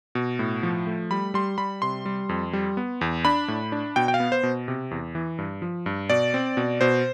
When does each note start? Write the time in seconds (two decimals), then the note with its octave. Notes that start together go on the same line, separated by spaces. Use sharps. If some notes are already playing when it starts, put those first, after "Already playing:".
0.15 B2
0.39 A2
0.63 F3
0.87 A3
1.11 G3 B5
1.34 G3 C6
1.58 G3 B5
1.82 C3 C6
2.06 G3
2.29 F2
2.53 G3
2.77 B3
3.01 E2
3.25 D4 B5
3.48 A2
3.72 D4
3.96 B2 G5
4.08 G5
4.14 F5
4.20 B3
4.32 C5
4.43 B2
4.68 C3
4.91 E2
5.15 E3
5.38 G2
5.62 F3
5.86 G2
6.10 B2 D5
6.34 C4
6.57 B2
6.81 B2 C5